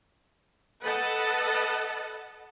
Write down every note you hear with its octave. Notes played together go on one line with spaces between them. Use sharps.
A4 B4 D#5 F#5 A5